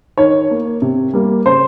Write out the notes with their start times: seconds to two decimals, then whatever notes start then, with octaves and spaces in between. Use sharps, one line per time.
0.18 D#3 C#5
0.51 A#3
0.82 C3
1.13 G3 A#3
1.45 C#3 C5